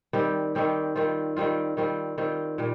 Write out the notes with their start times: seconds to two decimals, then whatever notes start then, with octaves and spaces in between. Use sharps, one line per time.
0.13 D#3 G3 C4 G4
0.55 D#3 G3 C4 G4
0.96 D#3 G3 C4 F4
1.36 D#3 G3 C4 F4
1.77 D#3 G3 C4 F4
2.18 D#3 G3 C4 F4
2.58 A#2 G3